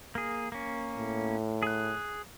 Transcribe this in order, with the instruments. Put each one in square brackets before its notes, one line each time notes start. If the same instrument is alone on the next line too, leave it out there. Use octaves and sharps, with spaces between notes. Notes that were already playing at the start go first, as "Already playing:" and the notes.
[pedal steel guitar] A#3 G#4
A#3 C#4
[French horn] A2
[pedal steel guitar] G#4 F#6